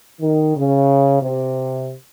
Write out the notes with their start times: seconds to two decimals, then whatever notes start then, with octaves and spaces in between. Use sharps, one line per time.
0.22 D#3
0.56 C#3
1.22 C3